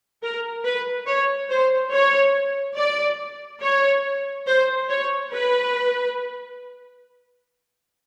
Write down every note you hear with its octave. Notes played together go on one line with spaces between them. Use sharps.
A#4
B4
C#5
C5
C#5
D5
C#5
C5
C#5
B4